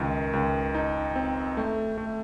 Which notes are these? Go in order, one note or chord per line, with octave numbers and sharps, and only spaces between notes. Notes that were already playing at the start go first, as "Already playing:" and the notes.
Already playing: C#2 D#3
C#2
D#4
C4
A3
A3